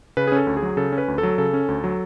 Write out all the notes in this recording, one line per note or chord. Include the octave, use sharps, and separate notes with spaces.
C#3 B4
G#4
C#4 A4
D2
G#4
F#3
C#3 A4
C#4
B4
D2
A4
F#3
C#3 A4
C#4
D2
F#3